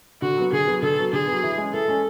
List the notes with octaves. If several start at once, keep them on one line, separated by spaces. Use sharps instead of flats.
D3 F#4
F#3 B3
D3 G#4
F#3 B3
D3 A4
F#3 B3
D3 G#4
F#3 B3
E3
G#3 C#4
E3 A4
G#3 C#4